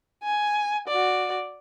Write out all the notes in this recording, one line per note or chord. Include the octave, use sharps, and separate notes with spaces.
G#5
F#4 D5